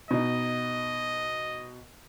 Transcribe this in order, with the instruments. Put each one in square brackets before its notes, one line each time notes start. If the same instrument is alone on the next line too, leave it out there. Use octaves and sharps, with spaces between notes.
[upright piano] B2 D#4 [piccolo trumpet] D#5